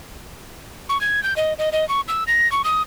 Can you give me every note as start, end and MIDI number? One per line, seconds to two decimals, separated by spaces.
0.89 1.00 85
1.01 1.23 92
1.23 1.34 91
1.36 1.53 75
1.59 1.69 75
1.73 1.87 75
1.89 2.01 85
2.08 2.24 88
2.27 2.50 94
2.52 2.62 85
2.64 2.82 87